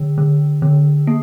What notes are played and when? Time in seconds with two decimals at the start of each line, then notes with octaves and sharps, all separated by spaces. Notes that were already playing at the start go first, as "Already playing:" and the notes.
Already playing: D3
0.18 D3
0.62 D3
1.07 A#3